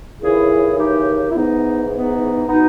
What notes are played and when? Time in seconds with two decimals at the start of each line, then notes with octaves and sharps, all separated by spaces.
0.22 D#2 C#3 E3 E4 G#4
0.78 D#4 G4
1.31 E4
1.35 G#2 E3 B3 D#4
1.92 B3 D#4
2.48 B2 B3 D#4